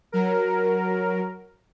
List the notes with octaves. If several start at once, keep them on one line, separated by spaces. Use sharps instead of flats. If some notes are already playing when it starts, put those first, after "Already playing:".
F#3 A#4